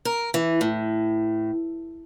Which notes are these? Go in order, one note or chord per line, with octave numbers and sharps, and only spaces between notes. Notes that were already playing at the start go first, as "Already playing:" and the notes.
A#4
E3
A2